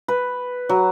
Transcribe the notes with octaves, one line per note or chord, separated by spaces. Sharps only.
B4
F#3